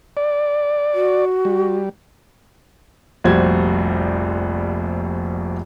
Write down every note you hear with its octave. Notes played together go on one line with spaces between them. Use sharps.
D5
F#4
G3
F1 A#1 G3 F#4 C5 G#6